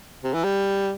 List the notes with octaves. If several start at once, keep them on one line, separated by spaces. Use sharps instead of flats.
C3
E3
G3